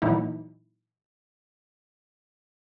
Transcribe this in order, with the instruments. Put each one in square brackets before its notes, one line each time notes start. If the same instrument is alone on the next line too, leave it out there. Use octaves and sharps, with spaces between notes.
[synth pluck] A#2 E3 F#3 D#4 E4